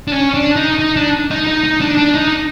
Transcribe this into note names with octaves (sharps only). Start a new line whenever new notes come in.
D4
C#4
D4
D#4
D#4
D4
D#4
D#4
D#4
D4
D4
D#4